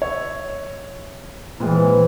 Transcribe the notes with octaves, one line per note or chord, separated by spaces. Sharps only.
C#5 E5
A#2 E3 G#3 C4 E4 B4